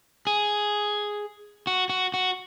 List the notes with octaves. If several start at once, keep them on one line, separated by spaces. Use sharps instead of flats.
G#4
F#4
F#4
F#4